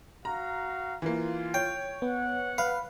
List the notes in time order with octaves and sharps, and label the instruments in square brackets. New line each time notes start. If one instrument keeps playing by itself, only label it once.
[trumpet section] F#4 F5 [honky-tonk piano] A#5
[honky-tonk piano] E3 A#3 [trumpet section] F4
[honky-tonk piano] C#5 [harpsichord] G5
[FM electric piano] B3 [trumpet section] F#5
[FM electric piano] B4 [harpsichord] F5